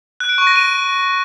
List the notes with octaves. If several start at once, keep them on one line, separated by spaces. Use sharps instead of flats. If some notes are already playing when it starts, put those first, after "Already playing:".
F#6
D7
C#6
A#6
D#7